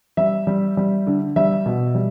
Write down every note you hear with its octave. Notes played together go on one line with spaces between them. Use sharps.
G3 E5
G3
G3
D3
G3 E5
B2
G3